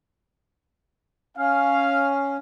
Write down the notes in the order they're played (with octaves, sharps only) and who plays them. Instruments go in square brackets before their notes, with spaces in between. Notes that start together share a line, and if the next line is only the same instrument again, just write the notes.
[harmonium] C#4 [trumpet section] F5